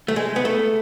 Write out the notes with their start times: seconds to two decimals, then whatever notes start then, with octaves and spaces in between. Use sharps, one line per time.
0.08 A3
0.16 G#3
0.36 B3
0.45 A3